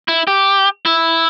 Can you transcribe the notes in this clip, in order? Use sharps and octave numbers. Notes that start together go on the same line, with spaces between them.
E4
G4
E4